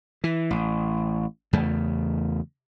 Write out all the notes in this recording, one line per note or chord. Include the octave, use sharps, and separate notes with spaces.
E3
A1
E2 C#3 A3